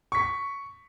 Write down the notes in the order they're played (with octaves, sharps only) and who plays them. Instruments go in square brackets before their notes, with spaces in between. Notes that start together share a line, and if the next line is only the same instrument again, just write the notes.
[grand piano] C#6 B6